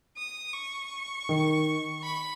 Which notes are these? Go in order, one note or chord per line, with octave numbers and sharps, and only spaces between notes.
D#6
C#6
D#3
B5